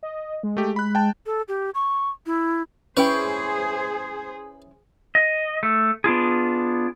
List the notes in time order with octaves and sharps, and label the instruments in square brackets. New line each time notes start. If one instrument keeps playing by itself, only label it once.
[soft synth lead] D#5
G#3
[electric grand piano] A3 G4
B5 F#6
G5 A5
[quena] A4
G4
C#6
E4
[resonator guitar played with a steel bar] C#4 E4 G5 [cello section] G#4 C5 [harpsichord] B4
[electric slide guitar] D#5
A3
B3 D4 F4 G#4